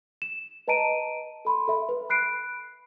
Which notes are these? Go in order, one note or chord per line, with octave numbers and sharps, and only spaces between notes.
E7
B4 D#5 A5 A#5 D7 D#7
A4 B5 C6
A4 E5 B5
B4
B5 F#6 C7 D7